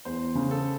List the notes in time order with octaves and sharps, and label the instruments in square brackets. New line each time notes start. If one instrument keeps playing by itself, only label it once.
[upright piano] E2 [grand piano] C5
[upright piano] C#3
[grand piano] A4